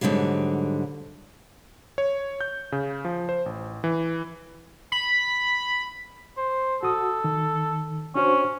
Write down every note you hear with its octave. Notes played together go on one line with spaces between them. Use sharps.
G#2 D3 E3 F#3 G3
C#5
G6
C#3
F3
C5
A1
E3
B5
C5
F#4 A4 D#6
D#3
C#4 D4 F#4 C5